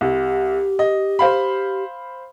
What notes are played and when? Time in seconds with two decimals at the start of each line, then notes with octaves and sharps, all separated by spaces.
0.01 C2 G4
0.79 D#5
1.19 C5 F5 B5